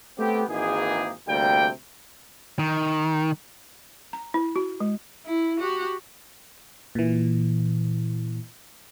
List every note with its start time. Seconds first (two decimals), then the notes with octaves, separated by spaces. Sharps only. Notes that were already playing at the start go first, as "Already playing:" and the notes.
0.18 A3 B3 C4 G4
0.49 G#1 G#2 E3 A#3 G4 G#4
1.28 D2 C3 G3 A#3 G5
2.59 D#3
4.13 A#5
4.34 E4
4.56 F#4
4.80 G#3
5.26 E4
5.60 F#4 G4
6.95 A#2 E3